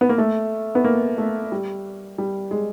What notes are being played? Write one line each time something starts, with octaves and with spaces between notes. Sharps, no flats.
B3
A#3
A3
B3
A#3
A3
G3
G3
G#3